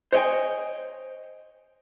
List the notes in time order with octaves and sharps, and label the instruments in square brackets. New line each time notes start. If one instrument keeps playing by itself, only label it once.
[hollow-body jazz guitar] C5 C#5 D#5 G5 G#5